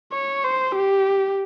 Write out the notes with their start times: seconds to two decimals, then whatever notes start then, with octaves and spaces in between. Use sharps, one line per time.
0.13 C#5
0.44 C5
0.75 G4